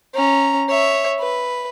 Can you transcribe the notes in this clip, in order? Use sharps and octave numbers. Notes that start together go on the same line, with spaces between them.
C#4 A#5
C#5 E5
B4